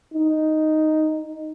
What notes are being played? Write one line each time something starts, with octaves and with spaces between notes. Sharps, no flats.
D#4